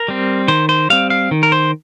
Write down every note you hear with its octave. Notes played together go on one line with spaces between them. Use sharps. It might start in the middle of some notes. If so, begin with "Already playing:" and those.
Already playing: A#4
G3 C4
D#3 C5
C5
G3 C4 F5
F5
D#3
A#4
C5